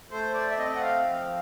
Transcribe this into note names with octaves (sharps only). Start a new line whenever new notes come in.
A3 C5
D5
E5
C4 D#5
F#5
F5
F3